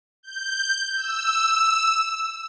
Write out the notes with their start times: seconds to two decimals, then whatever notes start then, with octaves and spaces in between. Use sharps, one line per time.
0.23 G6
0.97 E6